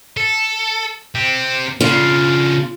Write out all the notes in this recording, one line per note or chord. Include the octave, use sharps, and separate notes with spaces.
A4
C4 G4
C#3 D4 F4